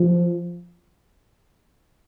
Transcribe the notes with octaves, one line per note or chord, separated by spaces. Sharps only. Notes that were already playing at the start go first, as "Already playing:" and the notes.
Already playing: F3